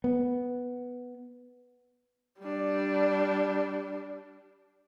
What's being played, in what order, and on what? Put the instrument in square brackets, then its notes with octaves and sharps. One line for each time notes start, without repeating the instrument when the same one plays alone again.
[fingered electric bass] B3
[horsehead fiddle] G3 D4